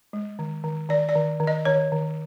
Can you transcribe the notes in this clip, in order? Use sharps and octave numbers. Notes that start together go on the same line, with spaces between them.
G#3
D#3
D#3
D#3 D5
D5
D#3
D#3
D#5
D#3 C#5
D#3